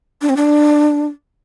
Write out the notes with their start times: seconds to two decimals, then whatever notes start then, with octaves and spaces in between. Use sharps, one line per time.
0.21 D4
0.29 C4
0.37 D4